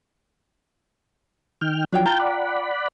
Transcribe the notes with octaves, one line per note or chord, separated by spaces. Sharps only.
D#3 G5 F6
F3 F#3 D4 C#5 G5
F4 G5 A5 A#5 G6
D5 F#5 B5